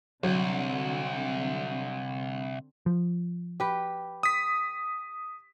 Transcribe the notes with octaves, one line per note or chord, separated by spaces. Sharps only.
C2 D3 F#3 C4
F3
G4 B4
D#6 B6